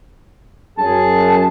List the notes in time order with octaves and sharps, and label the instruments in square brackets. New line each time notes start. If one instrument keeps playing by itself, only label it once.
[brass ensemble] F#2 G#4 [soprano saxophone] A5